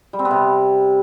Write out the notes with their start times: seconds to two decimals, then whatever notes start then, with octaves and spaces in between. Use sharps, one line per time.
0.13 G3
0.19 C4
0.25 B3
0.31 C3